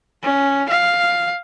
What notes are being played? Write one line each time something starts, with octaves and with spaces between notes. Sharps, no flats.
C#4
F5